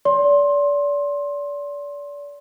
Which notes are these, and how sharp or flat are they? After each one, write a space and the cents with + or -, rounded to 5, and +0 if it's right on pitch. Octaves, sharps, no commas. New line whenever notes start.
D5 -35 C6 +20